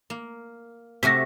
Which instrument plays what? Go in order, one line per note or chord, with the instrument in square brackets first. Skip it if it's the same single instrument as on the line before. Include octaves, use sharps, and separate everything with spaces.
[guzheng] A#3
[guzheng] C3 A3 F#4 [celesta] A#6 B6